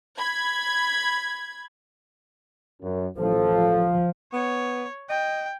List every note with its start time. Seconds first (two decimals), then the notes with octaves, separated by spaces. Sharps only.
0.17 B5 G#6
2.82 F#2
3.18 A1 F3 A4
4.33 B3 C#5
5.09 D#5 G5